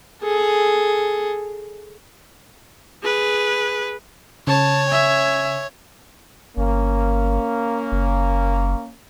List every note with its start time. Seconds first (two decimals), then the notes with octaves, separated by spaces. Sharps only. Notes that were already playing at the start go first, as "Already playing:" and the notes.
0.22 G#4 A4
3.03 G#4 B4
4.47 C#3 C#5 A5
4.89 E5 G#5
6.57 G1 A#3 C#4
7.92 F#1